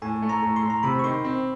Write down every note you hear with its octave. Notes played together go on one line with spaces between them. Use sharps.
A2 G#5
A3
A#5
A2
C6
A2
A#5
C3 B5
C#6
D#3 C6
C4